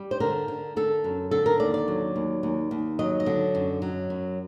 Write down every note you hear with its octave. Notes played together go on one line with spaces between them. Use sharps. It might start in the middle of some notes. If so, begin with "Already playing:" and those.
Already playing: G3
C5
D3 A#4
D3
D3 A4
F#2
D3 A4
A#4
D#2 D5
D5
F#3
D#2
D#2
D#2
F#3 D#5
D#5
D3
F#2
F#3
F#2